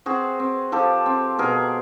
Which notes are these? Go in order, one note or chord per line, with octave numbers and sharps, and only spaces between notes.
C4 F#4 G#4
C4
F3 G4 A4
C4
B2 G#4 A#4